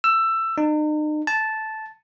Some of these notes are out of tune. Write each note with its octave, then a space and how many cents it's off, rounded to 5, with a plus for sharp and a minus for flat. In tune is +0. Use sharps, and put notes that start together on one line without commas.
E6 +15
D#4 -40
A5 -10